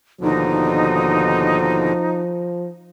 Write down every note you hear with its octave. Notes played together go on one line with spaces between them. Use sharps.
D#2 B2 D3 F3 D#4